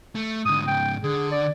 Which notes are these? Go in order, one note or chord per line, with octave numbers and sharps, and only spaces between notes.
A3
G#2 D3 D#6
G#2 C#3 G5
D3 G#4
D5